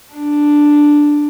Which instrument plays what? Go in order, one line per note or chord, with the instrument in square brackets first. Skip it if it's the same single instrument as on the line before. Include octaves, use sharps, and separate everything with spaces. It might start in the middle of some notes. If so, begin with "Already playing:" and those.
[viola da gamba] D4